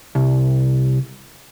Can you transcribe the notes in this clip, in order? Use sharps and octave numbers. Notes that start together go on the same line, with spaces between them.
C2